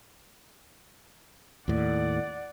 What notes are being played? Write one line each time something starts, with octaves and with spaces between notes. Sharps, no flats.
D#2 A2 D5 F#5